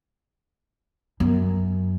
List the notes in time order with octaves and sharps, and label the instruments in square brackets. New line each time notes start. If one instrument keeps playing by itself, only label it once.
[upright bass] F#2